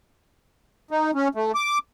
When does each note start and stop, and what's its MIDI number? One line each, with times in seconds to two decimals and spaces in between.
0.91 1.11 63
1.14 1.28 61
1.35 1.52 57
1.55 1.78 86